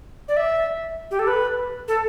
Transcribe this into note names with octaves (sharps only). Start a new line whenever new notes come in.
D5
E5
G4
A4
B4
A4